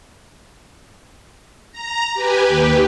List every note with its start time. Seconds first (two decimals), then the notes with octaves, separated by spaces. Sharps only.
1.72 A#5
2.14 G4 B4 G#5
2.44 D#2 G4 B4